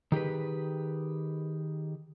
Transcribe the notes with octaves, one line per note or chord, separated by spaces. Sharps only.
D#3 G4 G#4 B4